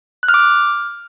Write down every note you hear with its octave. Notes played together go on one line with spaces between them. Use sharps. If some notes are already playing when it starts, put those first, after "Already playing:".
F#6
F6
D6
F6